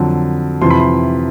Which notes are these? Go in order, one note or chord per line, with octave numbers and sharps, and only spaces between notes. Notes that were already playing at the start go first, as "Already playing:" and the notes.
Already playing: F2 D3 F#3
F2 C3 E3 C6
B5
C6